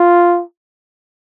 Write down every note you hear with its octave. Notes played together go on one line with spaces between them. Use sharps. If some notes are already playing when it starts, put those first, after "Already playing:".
Already playing: F4